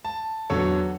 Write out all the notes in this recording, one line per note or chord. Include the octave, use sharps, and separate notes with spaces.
A5
E2 D3 F#3 A4 C#5 C#6